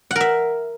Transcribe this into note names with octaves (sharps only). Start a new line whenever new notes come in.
A#4 E5 F#5